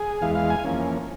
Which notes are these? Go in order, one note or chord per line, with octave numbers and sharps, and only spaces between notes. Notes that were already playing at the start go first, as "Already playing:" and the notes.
Already playing: G#4
E2 E3 G#3 F5
F5
G#5
F2 E3 A#3 C#4